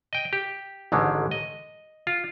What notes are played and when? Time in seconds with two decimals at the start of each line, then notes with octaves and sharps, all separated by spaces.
0.13 D#5 G5
0.33 G4
0.92 A1 G#2 D3 D#3 G#3
1.31 D#5
2.07 F4